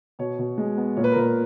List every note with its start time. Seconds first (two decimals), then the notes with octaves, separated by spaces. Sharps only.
0.19 B2 C#5
0.39 B2
0.58 G#3
0.77 B3
0.97 A#2 C#5
1.04 B4
1.12 A#4
1.16 A#2 B4